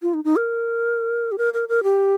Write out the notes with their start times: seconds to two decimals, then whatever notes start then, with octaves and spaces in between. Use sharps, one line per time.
0.02 F4
0.14 D#4
0.24 D#4
0.36 A#4
1.32 G4
1.38 A#4
1.54 A#4
1.69 A#4
1.83 G4